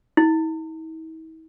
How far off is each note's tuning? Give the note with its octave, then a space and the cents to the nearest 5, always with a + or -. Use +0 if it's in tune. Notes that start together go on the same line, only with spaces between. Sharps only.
E4 -45